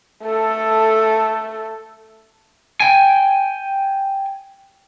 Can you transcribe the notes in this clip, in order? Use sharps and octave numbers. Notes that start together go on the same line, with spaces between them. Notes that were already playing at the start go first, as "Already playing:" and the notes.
A3 A4
G5 G#5